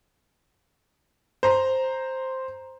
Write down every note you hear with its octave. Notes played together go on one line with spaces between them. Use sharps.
C5 A#5